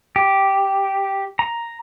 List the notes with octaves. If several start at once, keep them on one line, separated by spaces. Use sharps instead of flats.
G4
A#5